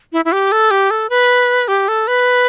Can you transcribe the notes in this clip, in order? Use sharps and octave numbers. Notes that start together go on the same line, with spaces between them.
E4
E4
G4
A4
G4
A4
B4
G4
A4
B4